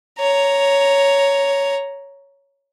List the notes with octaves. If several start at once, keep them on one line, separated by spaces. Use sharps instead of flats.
C#5 A#5